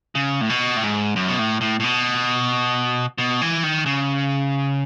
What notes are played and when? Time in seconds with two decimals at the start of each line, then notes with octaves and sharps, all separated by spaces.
0.15 C#3
0.41 A2
0.50 B2
0.77 A2
0.83 G#2
1.16 F#2
1.28 B2
1.39 A2
1.61 A2
1.80 A2
1.84 B2
3.18 B2
3.42 E3
3.63 D#3
3.86 C#3